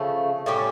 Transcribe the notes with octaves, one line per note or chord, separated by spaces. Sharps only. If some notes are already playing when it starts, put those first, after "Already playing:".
Already playing: C#3 F3 A3
A2 G3 C#4 G4